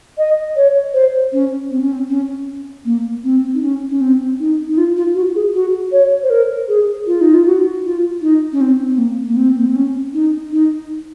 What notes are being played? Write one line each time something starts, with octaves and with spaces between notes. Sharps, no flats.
D#5
C#5
C5
C#4
C4
C#4
C4
C#4
A#3
C4
D#4
C#4
C#4
C4
D#4
D#4
F4
F4
F#4
G#4
F#4
C#5
C5
A#4
G#4
F4
D#4
F4
F#4
F4
D#4
C#4
C4
C4
A#3
A#3
C4
A#3
C4
C#4
D#4
D#4